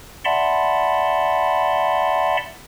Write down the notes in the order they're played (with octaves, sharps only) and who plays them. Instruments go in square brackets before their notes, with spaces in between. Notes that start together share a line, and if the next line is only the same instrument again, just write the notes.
[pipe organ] D5 E5 F#5 A5 B5 C6